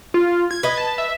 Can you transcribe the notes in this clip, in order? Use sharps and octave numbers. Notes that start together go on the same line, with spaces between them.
F4
G#6
B4 D#5
A5
E5